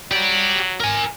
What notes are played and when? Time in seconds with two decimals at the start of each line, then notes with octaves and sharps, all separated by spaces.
0.12 F#3 G4 D5
0.80 A#4 G#5